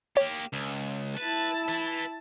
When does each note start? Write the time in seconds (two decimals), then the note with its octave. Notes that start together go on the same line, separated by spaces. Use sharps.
0.17 A#3 G4 C#5
0.53 C#2
1.17 E4 B4 A5
1.68 B4 E5